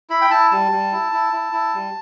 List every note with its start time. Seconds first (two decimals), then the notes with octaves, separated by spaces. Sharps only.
0.10 E4 B5
0.22 G5
0.31 E4 A5
0.51 G3 A5
0.72 G3
0.92 E4
1.13 E4
1.33 E4
1.53 E4
1.74 G3